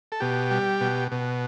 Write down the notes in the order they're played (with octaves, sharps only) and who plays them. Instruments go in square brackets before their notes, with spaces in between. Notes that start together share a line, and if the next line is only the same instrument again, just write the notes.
[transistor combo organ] A4
B2 G4
G3
B2
B2